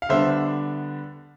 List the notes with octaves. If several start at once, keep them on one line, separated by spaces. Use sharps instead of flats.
F5
D3 G3 B3 D4 C5 E5